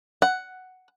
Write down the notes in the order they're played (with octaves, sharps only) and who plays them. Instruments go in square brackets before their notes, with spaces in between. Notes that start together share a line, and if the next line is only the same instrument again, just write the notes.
[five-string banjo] F#5